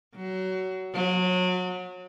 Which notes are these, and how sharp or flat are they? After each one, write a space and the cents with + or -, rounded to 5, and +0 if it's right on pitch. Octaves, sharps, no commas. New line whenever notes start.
F#3 +20
F#3 -30